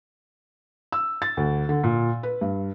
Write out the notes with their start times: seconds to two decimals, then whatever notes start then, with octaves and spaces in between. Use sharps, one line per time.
0.92 E6
1.22 A6
1.37 D2
1.69 D3
1.84 A#2
2.23 B4
2.41 G2